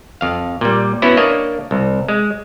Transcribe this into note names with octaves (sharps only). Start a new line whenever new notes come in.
F2 F5
A#2 G3
B3 C#4 E4 F#4
A#3 D4 C#5 D#5
C2
G#3